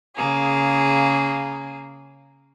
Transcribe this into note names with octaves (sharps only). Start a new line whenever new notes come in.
C#3 A#3 G#4